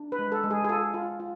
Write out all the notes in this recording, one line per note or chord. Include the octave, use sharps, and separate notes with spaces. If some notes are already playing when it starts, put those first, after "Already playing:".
Already playing: D4
B4
G#3
A4
G#3
G#4
G#4
F4 A4
F4
F4